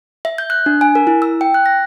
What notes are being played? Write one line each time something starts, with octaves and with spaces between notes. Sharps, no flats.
E5
G6
F#6
D4
G#5
A#4
E4
E6
G5
F#6
A#6